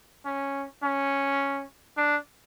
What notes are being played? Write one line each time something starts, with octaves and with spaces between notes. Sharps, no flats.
C#4
C#4
D4